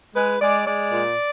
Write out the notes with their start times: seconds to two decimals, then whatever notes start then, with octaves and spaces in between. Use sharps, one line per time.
0.14 G#3 B4
0.40 G#3 D5
0.66 G#3 D5
0.91 A#2